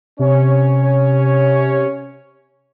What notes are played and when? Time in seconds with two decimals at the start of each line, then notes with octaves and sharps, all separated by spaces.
0.19 C3 C#4 C#5